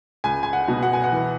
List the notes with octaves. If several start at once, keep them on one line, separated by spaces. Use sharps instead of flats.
C#2 G#5
G#5
F#5
B2
F#5
G#5
F#5
E3